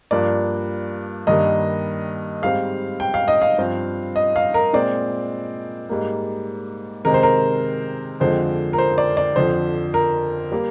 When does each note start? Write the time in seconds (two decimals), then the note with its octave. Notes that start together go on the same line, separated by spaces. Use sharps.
0.11 G2 F3 A#3 D5
1.27 G2 D#3 G3 A#3 D#5
2.42 G#2 G3 C4 F5
3.00 G5
3.14 F5
3.28 D#5
3.42 F5
3.59 G2 F3 C4
4.16 D#5
4.36 F5
4.54 A#4
4.73 A#2 G#3 C4 D5
5.89 G#2 G3 A#3
7.05 C3 D#3 G#3 C4 A#4
7.14 C5
7.23 A#4
8.20 F2 D3 F3 G#3 C4 C5
8.73 A#4
8.78 C5
8.98 D5
9.17 D5
9.36 F2 D3 F3 C5
9.94 A#4
10.52 G3 A#3